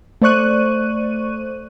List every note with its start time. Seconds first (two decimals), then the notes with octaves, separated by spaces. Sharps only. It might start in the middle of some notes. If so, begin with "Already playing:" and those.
0.22 A3 C5 D5 C#6 F#6 D#7